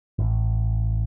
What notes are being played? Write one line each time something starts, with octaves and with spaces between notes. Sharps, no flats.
A1